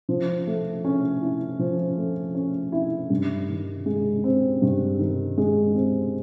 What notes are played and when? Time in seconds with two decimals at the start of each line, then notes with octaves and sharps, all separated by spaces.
0.09 F3
0.47 A3
0.85 C#4
1.21 E4
1.59 F3
1.97 A3
2.35 C#4
2.72 E4
3.10 G2
3.49 D#3
3.86 G#3
4.24 C4
4.62 G2
4.99 D#3
5.38 G#3
5.75 C4